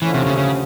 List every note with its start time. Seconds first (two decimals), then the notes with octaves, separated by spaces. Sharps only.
0.01 D#2 D3 E3 F3 A3 C#4
0.14 C3
0.26 C#3
0.38 C#3